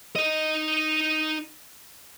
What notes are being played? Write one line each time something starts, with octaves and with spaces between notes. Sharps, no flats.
D#4 D#5